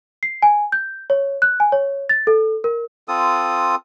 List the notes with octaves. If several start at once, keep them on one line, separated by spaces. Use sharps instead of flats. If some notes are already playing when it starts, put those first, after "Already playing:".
C7
G#5
G6
C#5
F#6
G#5
C#5
A6
A4
A#4
C4 F4 A4 D#6